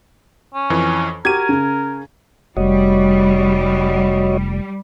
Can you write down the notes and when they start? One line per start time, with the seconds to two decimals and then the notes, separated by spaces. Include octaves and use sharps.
0.55 C#4
0.70 F2 E3
1.25 F#4 G4 A#4 G#6 D#7
1.49 C#3
2.57 F1 G3 F#4 C#5 D#5